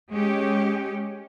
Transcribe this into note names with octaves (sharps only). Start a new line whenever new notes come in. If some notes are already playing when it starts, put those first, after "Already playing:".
G#3 C#4 G4